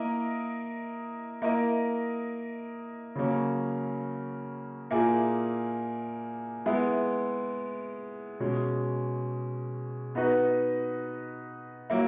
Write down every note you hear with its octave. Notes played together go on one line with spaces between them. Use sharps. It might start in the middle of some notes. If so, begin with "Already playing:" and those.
Already playing: A#3 E4 A#4 D#5
A#3 E4 A#4 D#5
C#3 F#3 A#3 C#4
A#2 A#3 E4 G#4
G#3 B3 E4
B2 G#3 C#4
B3 D#4 F#4 B4 D#5
F#3 A#3 E4